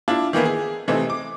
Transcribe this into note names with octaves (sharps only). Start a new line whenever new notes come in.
D4 E4 F4
D#3 E3 A#3 B3
G#4
C3 E3 A3 C4 D#4
D6